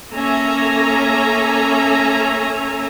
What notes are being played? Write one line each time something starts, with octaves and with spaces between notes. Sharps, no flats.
A#3 C#4 A4 E5 G#5 A#5